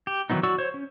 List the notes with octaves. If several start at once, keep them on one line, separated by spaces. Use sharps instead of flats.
G4
D#3 E3 F#3 B3 D#4
F#3 F#4 D5 C#6 E6
C5 C#5
C#4